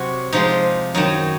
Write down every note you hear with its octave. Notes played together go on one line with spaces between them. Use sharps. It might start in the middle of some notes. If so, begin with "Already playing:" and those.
Already playing: C3 F#3 F#4
C3 F3 G#3 D#4
F#2 D#3 F#3 D#4